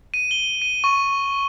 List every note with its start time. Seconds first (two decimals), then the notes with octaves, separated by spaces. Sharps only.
0.14 D#7
0.31 G7
0.62 D#7
0.84 C#6